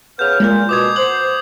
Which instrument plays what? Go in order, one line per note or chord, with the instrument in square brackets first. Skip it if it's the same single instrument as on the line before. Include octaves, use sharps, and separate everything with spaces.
[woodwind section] C#3 B3 F6 [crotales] G6
[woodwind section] A#2 [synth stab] G#3 A#3 A#4
[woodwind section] B2 [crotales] D6 D#6 G#6
[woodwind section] C5 [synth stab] F#5 [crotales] F#7